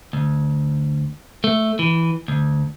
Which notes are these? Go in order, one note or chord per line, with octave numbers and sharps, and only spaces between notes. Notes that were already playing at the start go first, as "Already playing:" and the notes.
D2
A3
E3
D2